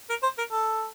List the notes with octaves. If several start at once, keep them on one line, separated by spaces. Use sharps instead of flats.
A#4
C5
A#4
A4